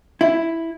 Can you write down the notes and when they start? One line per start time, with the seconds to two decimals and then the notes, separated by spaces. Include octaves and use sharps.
0.21 E4